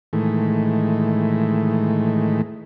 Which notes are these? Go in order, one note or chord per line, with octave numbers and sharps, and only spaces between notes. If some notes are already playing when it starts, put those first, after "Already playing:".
A2 D#3 E3 G#3 A3